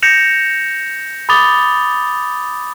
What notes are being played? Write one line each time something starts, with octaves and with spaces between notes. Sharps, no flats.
G6 A#6 C#7 E7 F7
B5 D6 D#6 A6 F7 G7